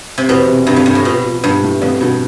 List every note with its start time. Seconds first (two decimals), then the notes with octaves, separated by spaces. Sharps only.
0.18 C3
0.29 E2 B2
0.47 C3
0.67 G2 C3
0.76 F2
0.86 G2 B3
0.95 A2
1.05 B2 F3
1.24 F3
1.43 G2 B3
1.63 A2
1.82 F2 B3
2.01 G2 B2